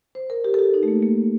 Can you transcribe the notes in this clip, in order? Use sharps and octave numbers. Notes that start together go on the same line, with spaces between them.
C5
A#4
G4
A4
G4
D#4
A3
A#3
A#3